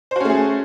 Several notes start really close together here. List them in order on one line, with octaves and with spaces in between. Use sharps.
C5 F#4 C#4 A3 G#4